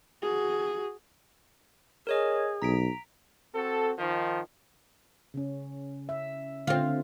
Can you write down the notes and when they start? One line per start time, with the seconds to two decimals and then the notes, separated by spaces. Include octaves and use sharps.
0.22 F#4 G#4
2.07 G#4 A#4 C#5 D#5
2.62 B1 A#5 B6 D7
3.55 C4 F#4 A4
3.99 D#3 F3
5.34 C#3 C#4
6.09 E5
6.67 D3 C4 F4